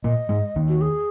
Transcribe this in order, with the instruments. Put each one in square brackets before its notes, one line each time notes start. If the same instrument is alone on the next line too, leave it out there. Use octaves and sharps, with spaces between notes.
[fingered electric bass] A#2 A#3 [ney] D#5
[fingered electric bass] G#2 G#3
D#2 D#3
[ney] F#4
G#4